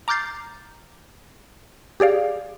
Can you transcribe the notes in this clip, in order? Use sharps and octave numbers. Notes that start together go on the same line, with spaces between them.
A#5 D6 F6 G6 A6 C7
G4 G#4 D5 F5